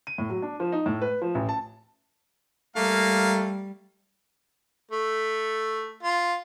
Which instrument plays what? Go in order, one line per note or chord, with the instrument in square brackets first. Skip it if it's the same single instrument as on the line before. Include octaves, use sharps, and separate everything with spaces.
[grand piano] D#7
A2
F#3
D4
F3
D#4
A2
B4
F3
A1
A5
[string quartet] G3 [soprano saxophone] A3 [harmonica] A#3 F5
[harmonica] A3
F4